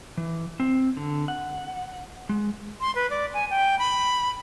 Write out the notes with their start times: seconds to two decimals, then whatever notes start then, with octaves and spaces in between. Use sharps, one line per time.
0.18 E3
0.60 C4
0.97 D3
1.28 F#5
2.29 G#3
2.81 C6
2.95 B4
3.10 D5
3.34 G#5
3.50 G5
3.79 B5